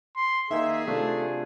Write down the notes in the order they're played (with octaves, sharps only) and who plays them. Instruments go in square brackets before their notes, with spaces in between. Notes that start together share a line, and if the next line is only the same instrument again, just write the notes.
[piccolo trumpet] C6
[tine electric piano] D#3 A#3 D#4 [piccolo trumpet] G#4 [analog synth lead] E5
[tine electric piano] C3 D4 F4 [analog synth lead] A3